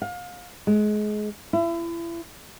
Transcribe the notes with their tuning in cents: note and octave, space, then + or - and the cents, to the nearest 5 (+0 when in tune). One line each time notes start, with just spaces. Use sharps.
F5 +30
G#3 +25
E4 +35